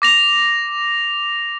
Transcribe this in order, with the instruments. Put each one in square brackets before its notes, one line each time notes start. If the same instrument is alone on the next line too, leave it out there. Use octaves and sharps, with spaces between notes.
[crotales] D6 A#6 F7